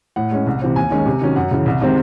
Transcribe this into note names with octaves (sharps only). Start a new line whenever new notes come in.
A2 F#5
G#3 C#4
C2
C3 E3 C4
D#2 G#5
D#3 G#3 C#4
C3
D#3 F#3 C#4
F#2 F#5
C#3 E3
C2
C3 D#3 G#3 C4